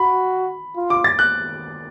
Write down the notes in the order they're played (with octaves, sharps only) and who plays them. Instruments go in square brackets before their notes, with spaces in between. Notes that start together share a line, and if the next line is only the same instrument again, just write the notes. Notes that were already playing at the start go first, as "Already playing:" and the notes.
Already playing: [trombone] F#4 [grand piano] B5
[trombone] F4
[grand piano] D6
A6
F#6